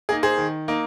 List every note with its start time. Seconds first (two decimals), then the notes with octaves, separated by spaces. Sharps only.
0.09 A#3 D#4 G#4
0.23 G#4 C5
0.38 D#3
0.68 A#3 D#4